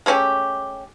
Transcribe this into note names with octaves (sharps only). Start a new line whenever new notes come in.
G#3 A3 C#4 G4